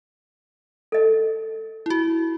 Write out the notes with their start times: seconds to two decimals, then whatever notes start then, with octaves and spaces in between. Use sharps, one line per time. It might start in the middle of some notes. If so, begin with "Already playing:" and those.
0.92 A4 D#5
1.86 E4 F#4